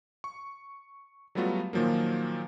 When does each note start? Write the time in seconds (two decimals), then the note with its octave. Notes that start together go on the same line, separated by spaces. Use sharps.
0.24 C#6
1.35 F#3 G3 A3 B3 F4 F#4
1.73 A#2 D#3 F3 F#3 A#3